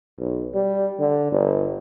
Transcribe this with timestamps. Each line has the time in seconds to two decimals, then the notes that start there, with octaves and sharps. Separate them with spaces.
0.18 B1
0.54 G3
1.00 D3
1.32 G1